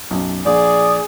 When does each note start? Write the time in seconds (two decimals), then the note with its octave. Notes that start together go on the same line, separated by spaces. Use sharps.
0.11 B1 F#2
0.46 A#1 G#4 D5 D#6